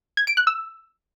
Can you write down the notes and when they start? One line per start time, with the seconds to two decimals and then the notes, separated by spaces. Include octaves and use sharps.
0.17 G#6
0.27 D7
0.37 F#6
0.47 E6